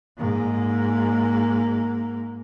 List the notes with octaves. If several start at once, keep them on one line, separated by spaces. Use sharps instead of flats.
G#2 A#3